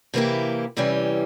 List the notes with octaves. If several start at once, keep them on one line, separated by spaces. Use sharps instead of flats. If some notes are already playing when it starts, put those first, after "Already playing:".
C3 E3 A#3 E4 G4
E2 C3 E3 G3 C#4